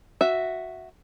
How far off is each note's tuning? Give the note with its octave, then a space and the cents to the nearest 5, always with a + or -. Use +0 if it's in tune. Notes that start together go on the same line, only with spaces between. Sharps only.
F#4 +0 E5 +0